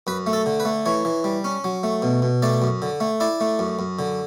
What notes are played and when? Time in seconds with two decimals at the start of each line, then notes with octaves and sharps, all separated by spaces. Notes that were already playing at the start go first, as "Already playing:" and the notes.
0.07 F#2 B4
0.27 A3
0.33 A4
0.46 D3
0.60 B4
0.65 A3
0.86 E3 C#5
1.05 E3
1.24 G3
1.44 C#4
1.64 F#3
1.83 A3
2.02 B2
2.22 B2
2.42 A3 D5
2.62 F#2
2.82 D3
3.00 A3
3.20 E4 D5
3.41 A3
3.59 F#2
3.79 F#2
3.99 D3